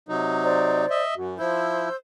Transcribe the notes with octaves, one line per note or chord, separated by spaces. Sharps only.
C3 F#3 D#4
C5 D5
D#5 E5
F#2 F#4
F3 E4 C5 E6 G6